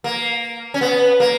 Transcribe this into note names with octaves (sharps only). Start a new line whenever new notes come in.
A#3
C#4
B3
A#3